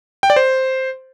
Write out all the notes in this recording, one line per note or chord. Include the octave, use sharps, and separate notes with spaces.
G5
D5
C5